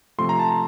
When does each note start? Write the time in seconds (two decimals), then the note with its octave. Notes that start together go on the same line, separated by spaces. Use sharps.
0.18 C3 F3 A3 C6
0.29 A#5
0.39 A5
0.50 A#5